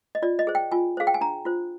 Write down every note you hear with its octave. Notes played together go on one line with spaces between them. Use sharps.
D#5
F4 D5
D#5
G#4 C5
G5
F4 G#5
G#4 C5 F5
G5
G#5
D4 A#5
F4 C5